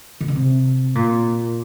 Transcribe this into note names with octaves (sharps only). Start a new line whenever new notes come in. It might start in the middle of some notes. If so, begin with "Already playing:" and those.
D#3
D3
C3
A#2